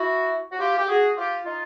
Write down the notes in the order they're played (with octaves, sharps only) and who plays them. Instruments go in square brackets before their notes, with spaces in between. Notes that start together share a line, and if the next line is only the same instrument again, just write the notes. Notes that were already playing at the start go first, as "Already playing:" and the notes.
Already playing: [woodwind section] E4 F#4
F#4
F4 G4
G4
F#4 G#4
F4 G4
D#4 F4